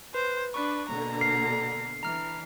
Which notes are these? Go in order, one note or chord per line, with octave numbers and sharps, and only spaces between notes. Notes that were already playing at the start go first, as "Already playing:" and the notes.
B4 C5
D4 B4 C#6 F#6
B2 D3 A#3 A#5
F6 C7
E3 D4 A#5 F6